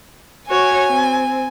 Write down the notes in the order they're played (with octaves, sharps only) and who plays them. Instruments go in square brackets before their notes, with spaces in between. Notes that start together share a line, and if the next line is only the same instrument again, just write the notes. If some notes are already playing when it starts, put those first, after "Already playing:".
[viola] F#4 C#5 [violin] G#5
[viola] C4